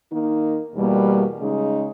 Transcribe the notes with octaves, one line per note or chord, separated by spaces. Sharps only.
D#3 A#3 D#4
E2 B2 G3 A#3
C#3 G#3 D#4